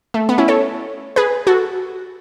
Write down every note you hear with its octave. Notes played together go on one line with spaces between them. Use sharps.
A3
B3
C#4 E4
A4 C#5
G#4 B4
F#4 A4